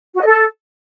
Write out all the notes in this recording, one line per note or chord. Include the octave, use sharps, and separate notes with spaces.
F#4
D#5
A4